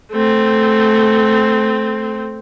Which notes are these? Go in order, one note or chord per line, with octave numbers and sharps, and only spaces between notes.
A3 C4